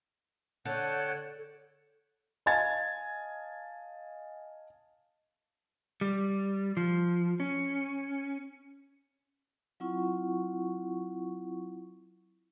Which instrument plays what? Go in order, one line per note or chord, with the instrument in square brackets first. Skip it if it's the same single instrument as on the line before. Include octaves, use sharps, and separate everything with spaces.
[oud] D3 [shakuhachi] C#5 [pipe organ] F#5 G5 A5
[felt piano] D#5 F5 G#5 A5 G#6 A6
[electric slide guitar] G3
F3
C#4
[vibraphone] F#3 C4 E4 F4 F#5 C#6